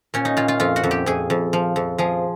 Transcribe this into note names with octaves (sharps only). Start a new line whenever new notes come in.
A#2 C#4
D#4
A#2 F4
F4
F2 F4
F#4
F2
G4
F2 G#4
F2
F3
F2
F3 G#4